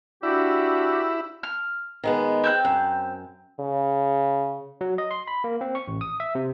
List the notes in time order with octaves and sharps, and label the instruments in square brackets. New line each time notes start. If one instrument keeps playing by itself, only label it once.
[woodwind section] D4 F#4 G4 [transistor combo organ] E4
[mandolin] F6
[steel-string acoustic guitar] D#3 G#3 B3
[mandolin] C4 G5 F#6
[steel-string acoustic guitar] F#2
[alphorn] C#3
[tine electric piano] F#3
D#5
C6
B5
A#3
C4
C#6
A1
D#6
E5
C3